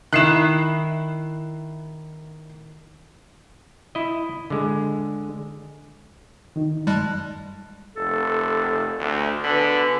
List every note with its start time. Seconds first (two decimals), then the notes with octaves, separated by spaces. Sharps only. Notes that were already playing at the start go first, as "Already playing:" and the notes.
0.13 D#3 E4 F#6 C7 E7
3.95 E4 D#5
4.50 D3 G#3
6.56 D#3 D#4
6.87 F#2 G3 G#3 A5 F#6
7.96 F1 A4
8.99 D2
9.44 B2 D3 G#4 B4 B5